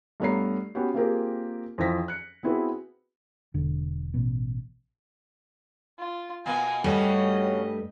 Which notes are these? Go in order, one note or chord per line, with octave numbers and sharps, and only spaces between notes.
G2 A3 B3 C#5 A#5 C7
B3 C#4 F#4 G4
A#3 C4 F4 G4 G#4 A#4
F2 E3 F3 C4 A#6 B6
F#6 C#7
B3 C4 E4 F#4 G#4 B4
E1 D3
A1 B2
F4
B2 A#3 B3 F5 G#5
G2 C#3 G3 A3 C#4 F#4 D#5